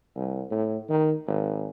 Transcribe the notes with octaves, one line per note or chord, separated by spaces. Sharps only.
C2
A2
D#3
G#1